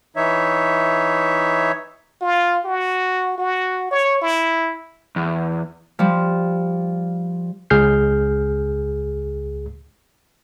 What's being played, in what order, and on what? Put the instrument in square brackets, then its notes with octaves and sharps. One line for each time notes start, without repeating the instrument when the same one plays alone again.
[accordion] E3 D#4 C#5 E5
[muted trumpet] F4
F#4
F#4
C#5
E4
[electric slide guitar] E2
[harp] F3 G3
[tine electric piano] C#2 G#4 F6 G6 C7